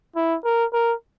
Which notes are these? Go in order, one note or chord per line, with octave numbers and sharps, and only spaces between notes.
E4
A#4
A#4